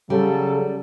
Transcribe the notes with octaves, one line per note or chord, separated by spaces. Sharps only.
C#3 F#3 G3 A4